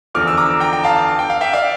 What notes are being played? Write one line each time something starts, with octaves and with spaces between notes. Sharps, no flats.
E2 D3 F3 D6 F6
E6
A#5 D6
G5 A#5
G5
F5 A5
G5
F5
E5 G5
D5 F5